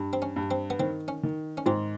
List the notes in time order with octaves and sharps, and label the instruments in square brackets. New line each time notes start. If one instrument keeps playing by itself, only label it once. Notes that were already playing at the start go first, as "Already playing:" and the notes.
Already playing: [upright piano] G2
[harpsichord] C4
C#4
[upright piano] G2
[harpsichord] C4
B3
[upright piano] D#3 [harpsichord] C4
[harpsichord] C#4
[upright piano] D#3
[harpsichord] C#4
[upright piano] G#2 [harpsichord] C4